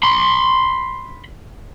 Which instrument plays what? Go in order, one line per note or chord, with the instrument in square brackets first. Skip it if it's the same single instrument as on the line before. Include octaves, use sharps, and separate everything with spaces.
[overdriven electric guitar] B5 C6